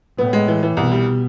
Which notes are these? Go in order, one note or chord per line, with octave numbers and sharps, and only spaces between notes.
A2 B3
G#3
E3
E3
C2 B2
G3